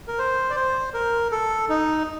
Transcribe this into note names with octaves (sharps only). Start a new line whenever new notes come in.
A#4
C5
D5
C5
A#4
A4
D#4